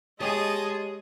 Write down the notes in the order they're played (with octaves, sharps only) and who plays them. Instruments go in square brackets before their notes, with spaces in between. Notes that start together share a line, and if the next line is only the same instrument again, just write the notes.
[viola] G#3 [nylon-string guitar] G4 C#5 [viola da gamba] G#4 [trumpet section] D#5 A5